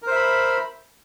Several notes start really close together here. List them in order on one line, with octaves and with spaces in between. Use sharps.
A#4 C5 E5 B5